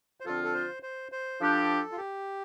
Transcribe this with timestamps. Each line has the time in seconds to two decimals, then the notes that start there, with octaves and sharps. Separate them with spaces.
0.20 C5
0.26 D3 F3 C4 F4 A4
0.44 A4
0.54 C5
0.83 C5
1.12 C5
1.40 F3 D4 G4 A4
1.92 F4
1.97 G4